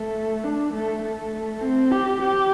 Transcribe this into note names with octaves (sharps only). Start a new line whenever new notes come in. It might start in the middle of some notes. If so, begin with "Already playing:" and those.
Already playing: A3
D4
A3
A3
C4
G4
G4